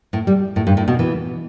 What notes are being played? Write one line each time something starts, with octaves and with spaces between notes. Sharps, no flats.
A2
G3
A2
G2
A2
B2
E3